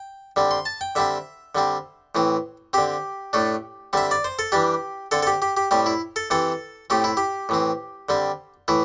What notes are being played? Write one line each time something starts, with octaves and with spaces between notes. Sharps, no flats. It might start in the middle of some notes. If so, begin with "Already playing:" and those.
Already playing: G5
D3 G3 C4
C6
A5
G5
D3 G3 C4 E5
D3 G3 C4
A2 E3 C4
D3 C4 G4
A2 A3 D4
D3 G3 C4 E5
D5
C5
A4
E3 G3 D4 G4
D3 C4 A4
A4
G4
G4
G4
A2 G3 C4 G4
E4
A4
C3 E3 C4 A4
A2 A3 C4 G4
E4
G4
A2 E3 C4
D3 G3 C4
A2 E3 E4